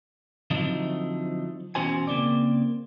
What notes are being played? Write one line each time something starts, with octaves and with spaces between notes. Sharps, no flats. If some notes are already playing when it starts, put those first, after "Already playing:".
D3 F3 F#3 A3 C4 D#4
B2 E3 C#4 F#4 C5 G#5
C#3 A#3 C4 D5